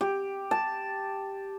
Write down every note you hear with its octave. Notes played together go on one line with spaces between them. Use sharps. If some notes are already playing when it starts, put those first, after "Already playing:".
G4
A5